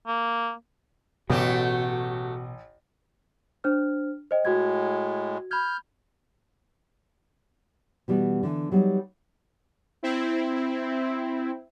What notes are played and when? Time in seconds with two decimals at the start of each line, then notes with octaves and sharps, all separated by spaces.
0.07 A#3
1.30 A1 B2 F#3 A3 F#4 G4
3.64 D4 C5 F6
4.31 C5 D#5 G5
4.45 A2 G#3 F#4 G#6
5.51 B5 F6 G6 G#6
8.08 B2 E3 G3 B3
8.43 D3 E3
8.71 F#3 G3 B3 D4 D#4
10.03 C4 E4